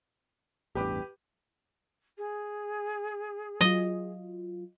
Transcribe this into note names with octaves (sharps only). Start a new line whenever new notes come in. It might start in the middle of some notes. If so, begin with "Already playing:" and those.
A1 E2 G2 G4 B4 D6
G#4
F#3 F4 D#5